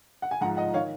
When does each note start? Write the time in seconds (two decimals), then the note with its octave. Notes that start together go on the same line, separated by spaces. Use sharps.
0.22 F#5
0.31 G#5
0.41 G#2 F#5 A#5
0.45 F3
0.57 D#5 F#5
0.74 D#3 C#5 F5